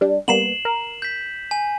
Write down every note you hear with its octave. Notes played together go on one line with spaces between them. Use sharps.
G3 D4
G3 A#3 B3 C7 E7 F#7
A#4
G6 B6
G#5